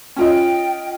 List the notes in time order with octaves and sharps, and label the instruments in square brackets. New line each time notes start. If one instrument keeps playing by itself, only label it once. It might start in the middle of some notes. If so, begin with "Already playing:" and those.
[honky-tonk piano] C#4 F4 D#5 [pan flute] G5